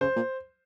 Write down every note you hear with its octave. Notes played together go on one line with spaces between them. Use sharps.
C#3 C5
A#2